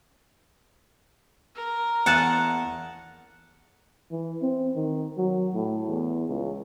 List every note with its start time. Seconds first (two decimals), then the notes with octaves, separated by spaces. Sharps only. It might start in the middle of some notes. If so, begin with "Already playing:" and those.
1.55 A#4
2.06 E2 F#5 G#5 A5
4.11 E3
4.42 C4
4.76 D#3
5.17 F#3
5.55 A2
5.88 E2
6.29 C#2